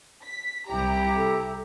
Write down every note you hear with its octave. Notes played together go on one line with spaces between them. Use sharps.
B6
C2 E4 G4 A#5
A4